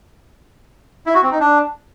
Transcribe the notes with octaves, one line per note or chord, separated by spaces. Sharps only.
E4
F#4
C4
D#4
D4